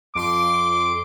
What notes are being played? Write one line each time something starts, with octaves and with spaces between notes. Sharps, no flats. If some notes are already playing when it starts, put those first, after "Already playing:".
F2 C6 D6 D7